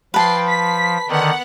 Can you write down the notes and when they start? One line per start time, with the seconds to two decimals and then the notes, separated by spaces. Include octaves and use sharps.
0.14 F3 B4 G5 A5 C7
0.47 B6
1.09 D3 D#3 B3 F#5